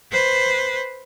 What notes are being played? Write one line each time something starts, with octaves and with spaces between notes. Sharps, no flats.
B4 C5